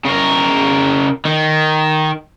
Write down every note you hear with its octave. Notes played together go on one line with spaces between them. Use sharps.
C#3 A#4
D#3